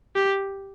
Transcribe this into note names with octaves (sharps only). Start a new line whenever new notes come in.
G4